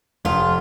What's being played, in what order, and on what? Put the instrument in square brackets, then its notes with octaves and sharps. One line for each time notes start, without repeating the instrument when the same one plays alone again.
[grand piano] F1 [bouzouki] F4